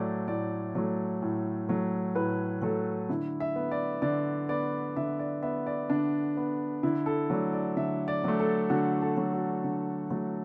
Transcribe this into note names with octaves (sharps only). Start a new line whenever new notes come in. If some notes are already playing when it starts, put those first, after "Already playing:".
Already playing: A2 F#3 A3 D5
A2 D5
F#3 A3
A2
F#3 A3
A2 B4
F#3 A3 A4
D3 E4
E5
B3
D5
D3 D5
B3 D5
D3 E5
D5
B3 E5
D5
D3 D4
B3
D3 E4
A4
F#3 A3 D5
D5
D3 E5
D5
F#3 A3
A4
D3 F#4
A4
F#3 A3
F#4
D3
F#3 A3